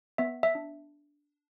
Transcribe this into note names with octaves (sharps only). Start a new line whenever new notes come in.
B3 E5
E5
D4